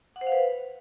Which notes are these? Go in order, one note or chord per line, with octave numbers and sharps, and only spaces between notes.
F#5
C5
F5
B4